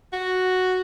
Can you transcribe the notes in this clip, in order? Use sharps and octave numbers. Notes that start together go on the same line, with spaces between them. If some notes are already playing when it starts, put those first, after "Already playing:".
F#4